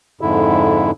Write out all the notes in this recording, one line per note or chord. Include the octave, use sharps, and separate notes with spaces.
F2 G#2 D3 E4